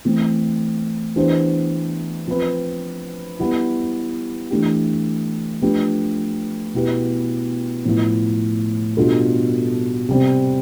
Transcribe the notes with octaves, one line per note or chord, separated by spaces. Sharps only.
E3 A3 C4
E3 B3 D4 G4 C5
F3 C4 F4 B4
G3 B3 E4
E3 A3 D4 G4
F3 A3 D4 G4 B4
B2 B3 E4 G4 B4
A2 F3 B3 E4
B2 G3 D4 F4 A4
C3 G3 C4